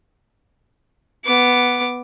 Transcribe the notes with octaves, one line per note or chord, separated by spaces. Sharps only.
B3 D6